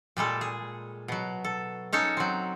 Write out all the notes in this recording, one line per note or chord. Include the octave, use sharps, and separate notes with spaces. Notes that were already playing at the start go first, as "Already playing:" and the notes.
A#2 G3 G#3 A4
G#4
B2 F#3
A4
C#4 D#4 A4 C#5
F#3 C4